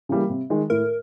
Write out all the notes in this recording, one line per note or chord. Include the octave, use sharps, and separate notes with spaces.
C#3 E3 G3 A#3
C3
D#3 G#3
A2 A#4